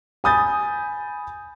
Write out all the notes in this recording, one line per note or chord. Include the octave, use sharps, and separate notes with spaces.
G#5 B5 D#6 G6 A6